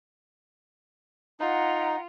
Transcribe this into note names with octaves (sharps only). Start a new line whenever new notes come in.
D#4 F4 F#5 A#5